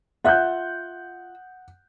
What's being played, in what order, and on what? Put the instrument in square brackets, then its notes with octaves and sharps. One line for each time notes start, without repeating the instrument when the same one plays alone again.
[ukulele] F4 E5 [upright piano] F#5 F#6 G6